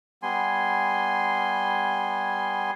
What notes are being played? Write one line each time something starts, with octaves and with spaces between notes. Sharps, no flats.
G3 B3 G#5 C6